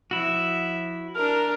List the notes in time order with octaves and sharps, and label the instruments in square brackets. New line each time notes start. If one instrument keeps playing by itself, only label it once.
[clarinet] F3 [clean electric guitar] E4 F#4 [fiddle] E5
[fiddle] D4 A#4 [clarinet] F6